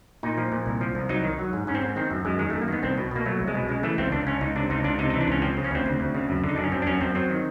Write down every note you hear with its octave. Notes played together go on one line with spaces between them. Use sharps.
A#2 D#4
F3
A#2
C2
F3
C2
F#3 D#4
D#3
F#3
G#2
G#2 C#4
C4
G#2
D#3 C4
F#2
F#2 G#3
D#3 G#3
A3
F#2
A#3
D#3 B3
C2 C4
B2
B2 A#3
F#3 A3
C2
G#3
B2
C#3 G#3
E3 A3
C#2 C4
C#2 D4
C#2 C#4
C#2 D#4
C3 D4
C#2 D#4
C#2 D4
C3 D#4
D#4
E3
D4
C#2 C#4
F3 C4
C#3
C#4
D2 C4
D2
D2
C#3
F#2
D3
D#4
F#2 D4
C#4
F#2 C4
D4
F#2 C#4
F#2 C4
F#3 C4
D#3